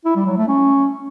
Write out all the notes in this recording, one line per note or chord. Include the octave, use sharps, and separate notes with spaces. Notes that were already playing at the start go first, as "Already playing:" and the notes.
E4
G3
F#3
A3
C#4